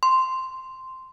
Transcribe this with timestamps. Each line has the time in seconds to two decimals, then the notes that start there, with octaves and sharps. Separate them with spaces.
0.03 C6